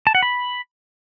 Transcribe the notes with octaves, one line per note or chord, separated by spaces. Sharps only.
A5
F#5
B5